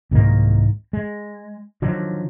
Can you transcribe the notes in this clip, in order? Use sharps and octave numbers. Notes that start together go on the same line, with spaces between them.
C2 G#2 D#3 A#3
G#3
D3 D#3 F3 F#3